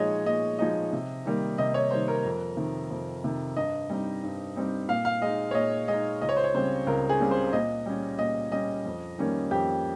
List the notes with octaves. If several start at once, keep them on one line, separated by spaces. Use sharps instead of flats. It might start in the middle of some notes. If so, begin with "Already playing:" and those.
Already playing: A#2 F3 G#3 D#4 C#5 D#5
A#2 D#5
F3 G#3 D#4 D#5
C3
D#3 G3 A#3
C3 D#5
C#5
D#3 G3 A#3 C5
A#4
F2
C3 D#3
F2
C3 D#3
G2 D#5
G3 C4 D#4
G2
G3 C4 D#4
A#2 F5
F5
G#3 D#4 D#5
C#5
A#2 D#5
G#3 D#4 D#5
C#2 D#5
C#5
C5
C#5
C#3 G3 C4 C5
C#2 A#4
G#4
C#3 G3 C4
C5
A#2 D#5
G3 C#4
A#2 D#5
G3 C#4 D#5
F2
D#3 G3 A#3 C#4
F2 G4